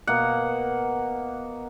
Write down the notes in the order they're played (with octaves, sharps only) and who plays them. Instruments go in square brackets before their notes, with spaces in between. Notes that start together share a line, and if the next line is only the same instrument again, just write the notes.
[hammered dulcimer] B2 A#3 F#5